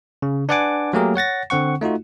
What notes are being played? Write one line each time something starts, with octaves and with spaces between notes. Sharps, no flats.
C#3
D4 B4 D5 F#5 G#5 D6
F#3 A3 A#3 G4 G#4 A#4
C#5 F#5 A6 A#6
D3 C4 F#5 C#6
A3 D#4 F4 F#4